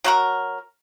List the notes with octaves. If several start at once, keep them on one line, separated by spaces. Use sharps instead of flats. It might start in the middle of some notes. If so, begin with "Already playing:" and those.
F#3 F#4 A#4